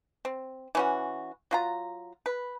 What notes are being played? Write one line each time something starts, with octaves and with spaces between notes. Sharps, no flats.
C4
E3 C#4 F#4
F#3 F4 A#5
B4